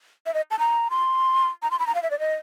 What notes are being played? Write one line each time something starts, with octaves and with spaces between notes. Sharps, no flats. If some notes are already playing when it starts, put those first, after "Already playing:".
E5
D#5
A5
A#5
C6
A#5
C6
B5
A#5
F5
E5
D5
D#5